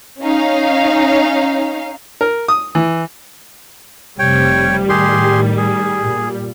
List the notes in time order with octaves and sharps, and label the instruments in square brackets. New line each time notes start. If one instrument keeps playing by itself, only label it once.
[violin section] C#4 D#4 F5
[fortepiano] A#4
D#6
E3
[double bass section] F1 C3 [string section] G3 [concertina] C#5 G5
[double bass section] A2 D#3 [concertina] G4 G#4 C6
[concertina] G#4
[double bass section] A#2